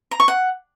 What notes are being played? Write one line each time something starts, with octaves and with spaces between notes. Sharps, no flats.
A#5
C#6
F#5